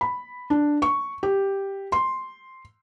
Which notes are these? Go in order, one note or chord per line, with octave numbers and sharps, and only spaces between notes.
B5
D4
C#6
G4
C6